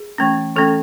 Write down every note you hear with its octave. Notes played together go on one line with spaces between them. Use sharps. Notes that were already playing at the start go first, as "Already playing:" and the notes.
Already playing: G#4
E3 A3 C#4
E3 A3 C#4 A4